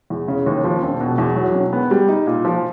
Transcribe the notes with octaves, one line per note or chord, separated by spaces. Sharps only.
E2
C#3
D#2
F3
E1
B2
E2
F#3
E1
B3
G3
D#4
A#2
F3